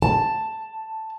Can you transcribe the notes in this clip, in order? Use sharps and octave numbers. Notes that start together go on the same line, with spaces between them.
A5